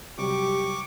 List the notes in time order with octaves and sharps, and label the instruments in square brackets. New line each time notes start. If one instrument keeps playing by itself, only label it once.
[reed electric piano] C3 F#3 G3 [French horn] G4 [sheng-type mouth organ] C#6 D6